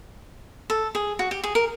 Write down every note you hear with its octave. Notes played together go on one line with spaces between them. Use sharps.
A4
G#4
F#4
G4
G#4
A#4